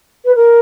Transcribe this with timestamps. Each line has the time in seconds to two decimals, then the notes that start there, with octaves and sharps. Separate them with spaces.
0.25 B4
0.35 A#4